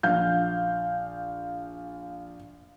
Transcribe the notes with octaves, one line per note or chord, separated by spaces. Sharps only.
A#1 F5 G6